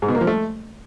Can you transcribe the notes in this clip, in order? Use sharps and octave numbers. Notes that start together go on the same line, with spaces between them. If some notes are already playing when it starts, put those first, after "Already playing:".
G#2
B2
A#3
F3
A3